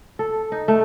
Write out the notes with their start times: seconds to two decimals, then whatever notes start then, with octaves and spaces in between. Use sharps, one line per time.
0.19 A4
0.52 D#4
0.68 A3